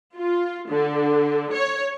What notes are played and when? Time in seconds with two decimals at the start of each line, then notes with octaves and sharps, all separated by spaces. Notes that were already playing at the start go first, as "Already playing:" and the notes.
0.15 F4
0.68 D3
1.53 C#5